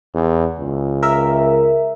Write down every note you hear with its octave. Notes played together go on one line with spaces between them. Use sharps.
E2
C#2
A#4 E5